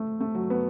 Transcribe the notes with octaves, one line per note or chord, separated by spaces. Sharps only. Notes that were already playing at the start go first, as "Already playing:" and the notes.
Already playing: A3
A3
F#3
B3